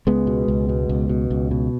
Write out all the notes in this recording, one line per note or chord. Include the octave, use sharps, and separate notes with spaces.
C#2 G#3 B3
B2
C#2
B2
C#2
B2
C#2
B2